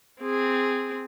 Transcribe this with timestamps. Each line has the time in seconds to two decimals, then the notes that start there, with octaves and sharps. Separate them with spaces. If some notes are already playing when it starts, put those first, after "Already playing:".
0.20 C4 G#4